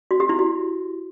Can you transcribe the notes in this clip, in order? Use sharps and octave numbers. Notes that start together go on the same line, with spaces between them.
F#4
G4
E4
F#4